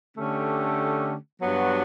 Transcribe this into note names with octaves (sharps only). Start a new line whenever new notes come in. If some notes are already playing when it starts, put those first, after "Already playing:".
D3 A3 C#4 G4
G2 F#3 B3 D4 F#4